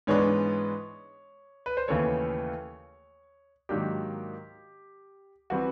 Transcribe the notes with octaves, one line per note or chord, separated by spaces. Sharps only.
G#2 E3 G#3 B3 D4 C#5
B4
C5
D#2 C#3 E3 A3 C#5
G#2 D#3 F#3 A#3 D4 G4
E3 G3 C4 F#4